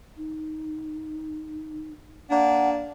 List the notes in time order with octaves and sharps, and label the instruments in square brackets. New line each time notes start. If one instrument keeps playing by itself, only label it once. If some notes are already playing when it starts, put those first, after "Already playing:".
[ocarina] D#4
[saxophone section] A#3 D4 [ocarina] F#5